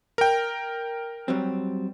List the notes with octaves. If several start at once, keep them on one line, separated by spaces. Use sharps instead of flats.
A#4 G5
F#3 G3 C4